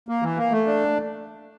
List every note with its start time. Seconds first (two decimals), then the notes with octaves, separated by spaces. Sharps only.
0.09 A#3
0.23 E3
0.37 A#3
0.52 A3
0.66 D4